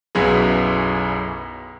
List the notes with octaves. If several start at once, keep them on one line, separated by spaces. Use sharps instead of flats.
B1 F#2 B3 E4 G#4